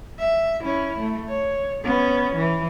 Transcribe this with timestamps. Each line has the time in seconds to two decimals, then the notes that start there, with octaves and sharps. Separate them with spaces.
0.19 E5
0.64 C#4 E4
0.99 A3
1.29 C#5
1.84 B3 C#4
2.36 E3